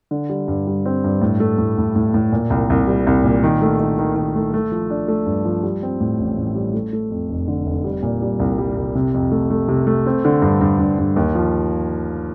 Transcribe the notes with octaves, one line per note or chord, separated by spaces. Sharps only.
D3
G3
G2
G3
C4
G2
A2
A3
A2
A2
A2
A2
A#2
C2
C2
G3
C2
A#2
D#3
A3
D#3
D#3
D#3
A3
A3
F3
D4
A3
G2
F3
G3
C4
A2
A1
A1
G3
A3
A3
F2
F1
D3
F1
G3
A#2
G3
C2
G3
C2
C3
F2
A3
A3
C3
A3
C4
D3
G2
G2
G2
G2
D#2
F3